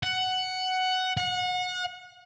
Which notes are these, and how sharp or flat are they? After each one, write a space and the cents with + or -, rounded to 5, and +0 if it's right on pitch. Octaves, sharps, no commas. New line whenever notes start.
F#5 +10
F#5 -30